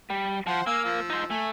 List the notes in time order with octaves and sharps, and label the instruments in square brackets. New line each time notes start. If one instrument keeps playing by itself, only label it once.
[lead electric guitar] G3
[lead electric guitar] F3 [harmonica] C5 F#5
[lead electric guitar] A#3 [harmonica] F5 G#5 E6
[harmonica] F3 E6
[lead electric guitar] D#4 C5
[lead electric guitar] A3 [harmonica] G#5